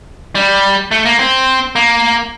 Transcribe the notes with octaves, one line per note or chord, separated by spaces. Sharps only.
G3
A3
A#3
C4
A#3